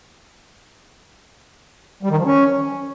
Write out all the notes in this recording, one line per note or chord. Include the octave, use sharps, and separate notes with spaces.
G3
D#3
F3
C#4